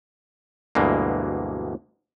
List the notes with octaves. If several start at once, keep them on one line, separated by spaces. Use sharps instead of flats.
D2 G2 B2 E3 G#3 A#3